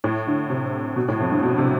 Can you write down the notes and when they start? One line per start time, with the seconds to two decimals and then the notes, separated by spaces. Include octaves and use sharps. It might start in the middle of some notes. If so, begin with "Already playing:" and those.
0.04 A2
0.27 D3
0.50 C3
0.96 B2
1.08 A2
1.20 F2
1.31 G2
1.43 B2
1.58 C3